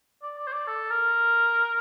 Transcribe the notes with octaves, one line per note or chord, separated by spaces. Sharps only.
D5
D5
C5
D5
A4
A#4